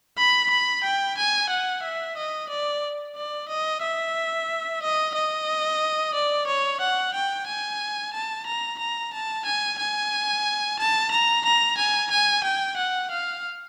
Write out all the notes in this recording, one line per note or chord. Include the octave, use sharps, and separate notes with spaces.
B5
B5
G5
G#5
F#5
E5
D#5
D5
D5
D#5
E5
D#5
D#5
D5
C#5
F#5
G5
G#5
A5
A#5
A#5
A5
G#5
G#5
A5
A#5
A#5
G#5
G#5
G5
F#5
F5